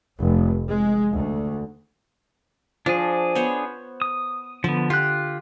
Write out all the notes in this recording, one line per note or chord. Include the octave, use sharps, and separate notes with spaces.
F1
G#3
D2
F3 D4 G#4
B3 C5 C#5
D#6
D3 F3 B3
F4 G4 F#6